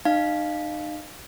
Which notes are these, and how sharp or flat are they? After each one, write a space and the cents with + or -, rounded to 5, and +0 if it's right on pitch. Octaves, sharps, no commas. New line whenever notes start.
D#4 -35 F5 +0